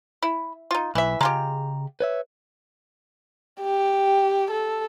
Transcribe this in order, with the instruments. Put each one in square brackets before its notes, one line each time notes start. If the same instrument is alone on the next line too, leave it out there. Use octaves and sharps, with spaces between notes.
[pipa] E4
D#4 F4
[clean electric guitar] B1 [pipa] E3 E5
[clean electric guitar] C#3 A#5 [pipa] G#3 F4 G4
[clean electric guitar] B4 C#5 E5
[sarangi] G4
A4